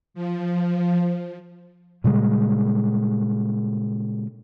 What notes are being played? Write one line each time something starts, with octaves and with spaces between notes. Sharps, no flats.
F3
A#2 C#3 G3 G#3